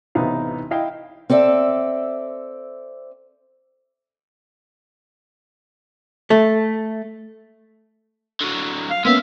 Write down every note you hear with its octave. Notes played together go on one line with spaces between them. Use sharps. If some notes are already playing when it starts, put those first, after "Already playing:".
A1 C3 B3 D#4 F5
E4 D#5 F5 G5
C4 A4 D5 E5
A3
D3 F#3
F5
G#3 A#3 B3 C#4 E5 F5